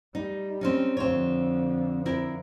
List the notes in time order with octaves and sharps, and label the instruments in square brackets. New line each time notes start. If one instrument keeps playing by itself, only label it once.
[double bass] G3 [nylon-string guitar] D#4
[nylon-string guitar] C4 C#4 D#4
[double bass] F2 D3 [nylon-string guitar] C4 C#5
[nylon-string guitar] C4 E4 A#4